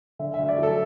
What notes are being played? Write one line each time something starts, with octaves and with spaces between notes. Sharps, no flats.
D3 E5
E5
D2
D5
F#3 A4